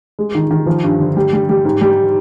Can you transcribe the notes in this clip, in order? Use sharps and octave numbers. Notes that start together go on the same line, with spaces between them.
G#3
D#3
D#3
F3
G2
D3
G3
G3
G3
G#2
G3